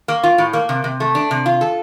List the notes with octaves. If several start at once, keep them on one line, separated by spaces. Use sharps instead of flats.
A#3
F4
A2
A#3
C3
C3
A3
D4
C3
F4
A4